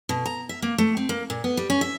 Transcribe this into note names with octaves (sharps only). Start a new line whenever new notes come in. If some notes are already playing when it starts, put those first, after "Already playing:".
B2
A#5
E5
A#3
A3
C4
A#3
A#2
B3
G3
C#4
E5